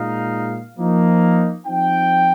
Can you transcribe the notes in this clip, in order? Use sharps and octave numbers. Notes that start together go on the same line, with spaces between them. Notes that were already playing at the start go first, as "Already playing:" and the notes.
Already playing: A#2 G#3 D#4 F5
F3 A#3 D#4
F3 C4 D#4 G5